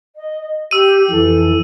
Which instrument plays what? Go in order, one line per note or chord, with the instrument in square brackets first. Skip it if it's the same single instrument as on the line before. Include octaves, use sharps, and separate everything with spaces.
[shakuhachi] D#5
[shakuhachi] G4 [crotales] E6 D#7
[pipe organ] F2 E3 [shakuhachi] A4